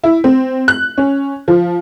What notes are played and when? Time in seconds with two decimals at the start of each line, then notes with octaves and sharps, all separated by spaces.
0.04 E4
0.24 C4
0.68 F#6
0.98 C#4
1.48 F3